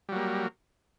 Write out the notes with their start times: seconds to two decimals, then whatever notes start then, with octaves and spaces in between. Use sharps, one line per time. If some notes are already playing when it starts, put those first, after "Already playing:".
0.09 G3
0.12 F#3
0.15 A#3